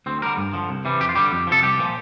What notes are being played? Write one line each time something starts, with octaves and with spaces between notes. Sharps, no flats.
D2 C4
D3 G3 A#4
G2
D3 F3
C2
C3 E3 G3
F2 G4
F4
D3 G3 G4
F2
C3 F3 A4
C2 G4
A#2 F3